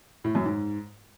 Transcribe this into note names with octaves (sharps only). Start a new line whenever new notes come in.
A2
F#2
G#2